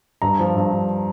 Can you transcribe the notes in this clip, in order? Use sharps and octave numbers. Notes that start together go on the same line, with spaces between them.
G2 A#5
F3
G2
G2